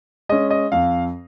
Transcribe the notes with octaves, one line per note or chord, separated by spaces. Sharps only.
G#3 C#4 D#5
D#5
F2 F5